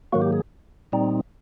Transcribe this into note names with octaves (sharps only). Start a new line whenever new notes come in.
G#2 D#3 F#3 A#3 F#4
G4
G#4
A#2 G3 C4 D#4